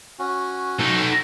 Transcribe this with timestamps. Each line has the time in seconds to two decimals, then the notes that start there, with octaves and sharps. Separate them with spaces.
0.19 C#4 F#4
0.79 D#4 A4